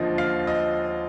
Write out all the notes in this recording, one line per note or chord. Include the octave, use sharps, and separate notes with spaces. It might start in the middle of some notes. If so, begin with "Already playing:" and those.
Already playing: D#2 D3 F3 D#5
F5
D#5